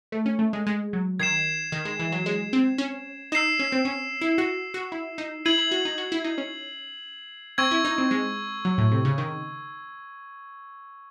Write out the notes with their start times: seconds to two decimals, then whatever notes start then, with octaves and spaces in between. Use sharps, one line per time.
0.12 A3
0.26 C#4
0.39 A3
0.53 G#3
0.67 G#3
0.93 F#3
1.19 D#3 G#6 C7 E7
1.72 D#3
1.85 G#3
2.00 E3
2.12 F#3
2.26 G#3
2.53 C4
2.78 C#4
3.32 D#4 E6 C7 E7
3.59 C#4
3.72 C4
3.85 C#4
4.21 E4
4.38 F#4
4.74 F#4
4.92 E4
5.18 D#4
5.45 E4 G#6 C7 D#7 F#7
5.58 E4
5.71 F#4
5.85 D#4
5.98 F#4
6.12 E4
6.24 D#4
6.38 C#4
7.58 C4 C#6 E6 G#6
7.71 E4
7.85 D#4
7.98 C4
8.11 G#3
8.65 F#3
8.78 A2
8.92 C3
9.05 C#3
9.18 D#3